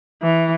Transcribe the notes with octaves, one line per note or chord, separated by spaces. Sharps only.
E3